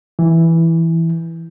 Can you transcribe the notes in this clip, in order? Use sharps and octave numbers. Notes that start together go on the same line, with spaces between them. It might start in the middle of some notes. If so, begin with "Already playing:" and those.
E3